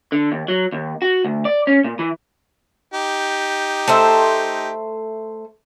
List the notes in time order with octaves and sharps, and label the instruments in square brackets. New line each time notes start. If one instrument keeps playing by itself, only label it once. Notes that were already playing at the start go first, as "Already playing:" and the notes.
[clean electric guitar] D3
D#2
F#3
D#2
F#4
D2
D5
C#4
A#2
E3
[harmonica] D#4 G4
[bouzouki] A3 C5 E5